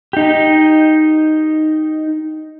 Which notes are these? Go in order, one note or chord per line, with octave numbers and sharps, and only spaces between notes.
D#4 G4